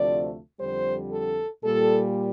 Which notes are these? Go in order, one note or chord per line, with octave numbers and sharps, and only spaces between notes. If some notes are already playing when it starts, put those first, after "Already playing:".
Already playing: D2 C3 F3 A3 D5
F2 D3 G3 C5
A4
A#2 G3 A4